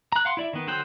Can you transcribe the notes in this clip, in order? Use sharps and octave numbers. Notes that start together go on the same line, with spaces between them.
A#5 F#6
F5 F#5 C6
E4 D5 E5
D#3 B3
D3 F#3 C5 F#5 G5